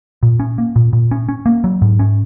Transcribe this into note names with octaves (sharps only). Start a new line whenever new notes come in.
A#2
C#4
A#3
A#2
A#2
C#4
C#4
A#3
F#3
G#2
C#4